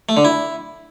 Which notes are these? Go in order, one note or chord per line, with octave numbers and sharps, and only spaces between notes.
A3
D3
E4